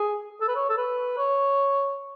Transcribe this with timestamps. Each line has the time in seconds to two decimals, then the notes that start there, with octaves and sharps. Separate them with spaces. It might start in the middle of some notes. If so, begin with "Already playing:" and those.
Already playing: G#4
0.41 A4
0.48 B4
0.55 C#5
0.69 A4
0.77 B4
1.17 C#5